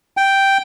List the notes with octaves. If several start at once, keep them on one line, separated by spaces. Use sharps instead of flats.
G5